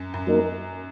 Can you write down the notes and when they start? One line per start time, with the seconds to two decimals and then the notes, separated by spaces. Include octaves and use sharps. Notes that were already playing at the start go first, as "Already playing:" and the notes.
Already playing: F#2
0.14 F#2
0.27 F#3 A#3 D#4 A#4